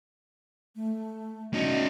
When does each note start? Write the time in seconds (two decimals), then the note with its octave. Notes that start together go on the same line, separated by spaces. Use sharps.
0.76 A3
1.54 C#4 D#4 F#4